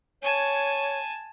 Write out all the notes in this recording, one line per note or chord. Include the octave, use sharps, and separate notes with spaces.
C#5 G#5 A5